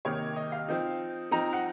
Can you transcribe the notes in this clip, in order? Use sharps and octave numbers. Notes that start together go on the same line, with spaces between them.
C3 D#3 A#3 D#4 C#5
D#5
F5
F3 C4 D#4
F3 C4 D#4 A#5
F#5